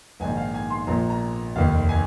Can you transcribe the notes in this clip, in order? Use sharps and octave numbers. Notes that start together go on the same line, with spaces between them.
A#1 G#2 D#3 G#5
F5
G#5
C6
A#1 A#2 F3 A#5
A#5
F1 D#2 D#3 F5
G#5